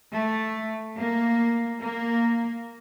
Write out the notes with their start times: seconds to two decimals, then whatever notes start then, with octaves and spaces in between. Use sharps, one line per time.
0.13 A3
0.97 A#3
1.81 A#3